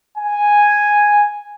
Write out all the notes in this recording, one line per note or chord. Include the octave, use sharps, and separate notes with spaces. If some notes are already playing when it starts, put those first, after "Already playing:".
G#5